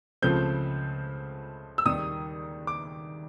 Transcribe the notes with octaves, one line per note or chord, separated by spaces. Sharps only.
C#2 C#3 F3 A3 C4 G6
E6
D#2 D#3 G3 D#6
D6